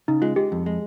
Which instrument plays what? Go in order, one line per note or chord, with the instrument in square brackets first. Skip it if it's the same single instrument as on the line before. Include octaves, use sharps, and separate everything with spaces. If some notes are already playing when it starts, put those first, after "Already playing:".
[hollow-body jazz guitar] C#3 [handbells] D#4
[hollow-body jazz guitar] G#3 [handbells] F4
[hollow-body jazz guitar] G#3 [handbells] G4
[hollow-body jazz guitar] F2
G#3